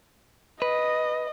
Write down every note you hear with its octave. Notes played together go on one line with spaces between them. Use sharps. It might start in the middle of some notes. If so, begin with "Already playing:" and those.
B4 D#5